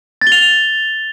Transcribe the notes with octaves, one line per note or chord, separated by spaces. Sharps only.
A6
G7
F7